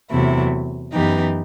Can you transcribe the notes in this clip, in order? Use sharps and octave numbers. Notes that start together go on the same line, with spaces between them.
E2 C3 F#3 A3 E4
F#2 E3 B3 D#4 G4